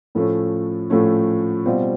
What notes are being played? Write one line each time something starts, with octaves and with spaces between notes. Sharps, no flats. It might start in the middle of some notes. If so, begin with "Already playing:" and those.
A2 F3 A3 C#4
A2 F3 A3 C#4
B2 G3 C4 F4